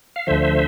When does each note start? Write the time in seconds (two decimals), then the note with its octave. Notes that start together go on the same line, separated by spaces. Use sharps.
0.16 F5
0.27 D2 D3 F3 C5 E5